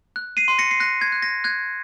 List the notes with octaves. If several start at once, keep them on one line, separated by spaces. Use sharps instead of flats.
F#6
C7 D#7
C6
A#6 C#7
C7
F#6 A#6
G#6
F#6
A#6
F#6 G#6